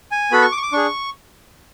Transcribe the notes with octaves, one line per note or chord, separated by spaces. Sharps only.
G#5
B3 F#4 A4 B5
C#6
D6
C#6
D6
D4 G#4 C#6